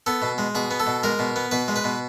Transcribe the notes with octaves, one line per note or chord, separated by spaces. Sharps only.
B3 A4
B2
G#3
B2 G#4
B3
A4
B2
G#3 A#4
B2
B3
B2 B4
G#3
B4
B2